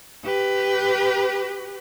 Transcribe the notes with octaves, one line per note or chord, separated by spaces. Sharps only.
G4 B4